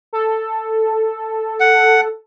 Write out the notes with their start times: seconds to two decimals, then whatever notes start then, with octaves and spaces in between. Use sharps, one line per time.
0.13 A4
1.60 F#5